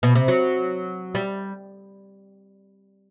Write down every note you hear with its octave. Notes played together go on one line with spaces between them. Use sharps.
B2
C3
F#3
G3